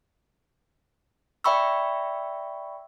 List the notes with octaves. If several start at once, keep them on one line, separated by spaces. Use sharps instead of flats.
D5 E5 G5 B5 C#6 E6